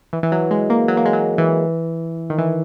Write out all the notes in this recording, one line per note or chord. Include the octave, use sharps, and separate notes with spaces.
E3
E3
F#3
G#3
A#3
F#3
A#3
G#3
F#3
E3
D#3
E3